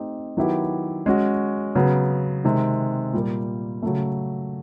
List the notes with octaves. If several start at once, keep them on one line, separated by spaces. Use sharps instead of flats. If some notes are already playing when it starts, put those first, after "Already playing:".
Already playing: A3 C4 D#4 G4
D#3 F#3 B3 E4 G4
G#3 C#4 F#4
C#3 F#3 B3
C3 D#3 G#3
A#2 G3 A#3
C#3 F#3 A3